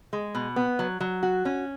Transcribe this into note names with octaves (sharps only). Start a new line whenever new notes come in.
G#3
B2
B3
F#3
F#3
F#4
C#4